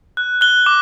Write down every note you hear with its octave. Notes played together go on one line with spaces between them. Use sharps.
F#6
F#6 G7
D6